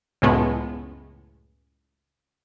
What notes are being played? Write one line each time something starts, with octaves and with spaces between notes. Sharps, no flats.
C#2 F#2 A2 G#3 A3 B3